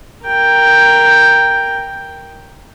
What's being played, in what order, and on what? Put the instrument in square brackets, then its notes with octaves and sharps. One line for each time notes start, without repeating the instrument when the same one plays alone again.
[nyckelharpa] A#4 G5